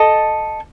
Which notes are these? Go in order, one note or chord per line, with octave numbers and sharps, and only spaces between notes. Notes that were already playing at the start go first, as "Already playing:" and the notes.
Already playing: A4 D#5